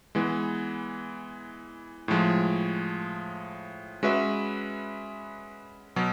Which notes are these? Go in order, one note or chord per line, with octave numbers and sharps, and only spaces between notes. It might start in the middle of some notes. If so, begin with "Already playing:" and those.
E3 G#3 B3
A2 F3 G#3
G#3 C#4 F#4 B4 E5
B2 F#3